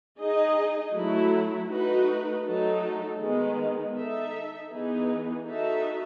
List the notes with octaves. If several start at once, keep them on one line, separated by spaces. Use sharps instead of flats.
D#4 G#4 D#5
F#3 A3 E4
A3 D#4 F#4 B4
F#3 A3 D#4 A4
D#3 G#3 B3
D#4 A4 E5
E3 B3 D#4 G#4
D#4 F#4 A4 E5